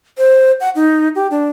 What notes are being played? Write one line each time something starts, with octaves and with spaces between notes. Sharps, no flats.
C5
F#5
D#4
G4
D4